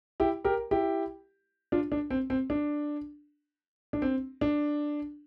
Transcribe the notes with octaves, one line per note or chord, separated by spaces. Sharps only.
E4 G4
G4 A#4
E4 G4
D4 F4
D4
C4
C4
D4
D4
C4
D4